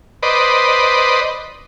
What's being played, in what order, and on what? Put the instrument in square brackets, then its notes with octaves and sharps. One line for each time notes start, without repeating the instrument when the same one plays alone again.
[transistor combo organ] B4 C5 D5 D#5